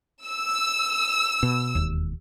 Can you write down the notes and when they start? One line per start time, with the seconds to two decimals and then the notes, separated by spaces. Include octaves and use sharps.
0.25 E6
1.43 B2
1.75 E1 D#2